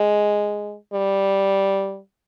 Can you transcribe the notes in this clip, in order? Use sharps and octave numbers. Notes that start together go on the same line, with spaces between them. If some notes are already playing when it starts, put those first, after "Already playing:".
Already playing: G#3
G3